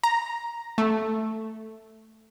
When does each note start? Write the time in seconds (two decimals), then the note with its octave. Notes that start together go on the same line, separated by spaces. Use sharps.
0.04 A#5
0.78 A3